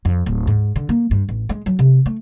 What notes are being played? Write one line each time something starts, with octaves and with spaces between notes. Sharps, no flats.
F2
D1
G#2
D3
A#3
G2
A1
G#3
F#3
C3
A3